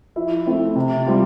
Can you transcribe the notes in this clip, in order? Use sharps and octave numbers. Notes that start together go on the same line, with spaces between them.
F3 E4 E5
A3 C4 E4
C3
G3 C4 F4